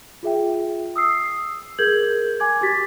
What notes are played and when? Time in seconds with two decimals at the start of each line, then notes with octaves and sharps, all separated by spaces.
0.23 F4 G#4 E5 G5
0.96 D#6 E6 C7
1.79 G#4 A#4 G6 G#6 F#7
2.40 G#5 D6 G#6
2.61 F#4 G4 A6 B6